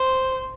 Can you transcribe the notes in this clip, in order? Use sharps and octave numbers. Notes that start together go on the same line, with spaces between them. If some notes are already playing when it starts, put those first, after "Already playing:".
Already playing: C5